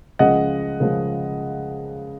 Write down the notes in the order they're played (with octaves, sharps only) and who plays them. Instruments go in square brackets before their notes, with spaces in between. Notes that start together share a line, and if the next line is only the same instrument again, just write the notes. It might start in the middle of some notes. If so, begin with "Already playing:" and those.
[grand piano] C#2 C#3 F3 G#3 D#5 F#5
C#2 C#3 F3 G#3